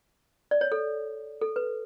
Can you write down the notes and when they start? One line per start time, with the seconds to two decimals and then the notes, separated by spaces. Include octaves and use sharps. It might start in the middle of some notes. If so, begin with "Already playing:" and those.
0.51 D5
0.61 C#5
0.72 A4
1.41 A4
1.56 B4